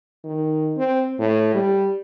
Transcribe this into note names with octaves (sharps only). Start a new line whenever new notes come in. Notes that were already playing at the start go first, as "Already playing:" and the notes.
D#3
C4
A2
G3